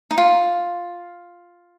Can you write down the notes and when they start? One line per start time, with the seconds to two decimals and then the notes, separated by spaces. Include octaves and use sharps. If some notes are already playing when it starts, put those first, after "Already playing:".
0.11 D#4
0.18 F4